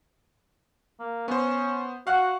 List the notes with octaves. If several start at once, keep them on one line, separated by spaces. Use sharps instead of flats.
A#3
B3 C#4 C5
F#4 F5 F#5 F#6